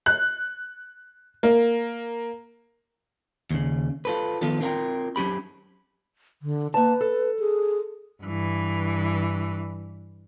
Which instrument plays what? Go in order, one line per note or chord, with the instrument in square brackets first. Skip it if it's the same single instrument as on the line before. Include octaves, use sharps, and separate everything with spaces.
[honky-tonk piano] F#6
A#3
[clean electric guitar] D#2 C#3
F4 A4 B4
D#3 F3 B3 F4 A4
C4 F4 A#4 F#5 G5 A#5
F#3 C#4 G4 B5
[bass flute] D3
[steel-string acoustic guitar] A#3 A5 [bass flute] B4
[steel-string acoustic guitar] A4
[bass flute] G#4
[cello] G2 E3